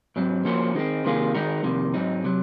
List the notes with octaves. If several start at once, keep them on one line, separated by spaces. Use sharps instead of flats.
G#2 F#3 C4
F3 A#3 C#4 F#4 C5
D#3 G#3 C4
C3 D#3 A#3 F4 G#4
D#3 G#3 D#4 F#4 A#4
F2 C3 D#3 A#3
G#2 F#3 C4 D#4
C3 D#3 F#3